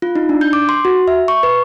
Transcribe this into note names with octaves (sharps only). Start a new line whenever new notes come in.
F4
D#4
D4
G6
D6
C6
F#4
E5
C#6
B4